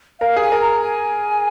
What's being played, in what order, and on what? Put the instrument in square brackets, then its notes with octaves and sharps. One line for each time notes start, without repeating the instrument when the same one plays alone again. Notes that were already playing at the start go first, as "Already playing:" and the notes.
[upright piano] A#4 [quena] F5
[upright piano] G#4 [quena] G#5
[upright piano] A#4
[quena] A#5
G#5